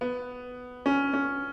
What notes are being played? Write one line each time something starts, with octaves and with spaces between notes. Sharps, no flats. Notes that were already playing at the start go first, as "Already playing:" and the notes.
B3
C#4
C#4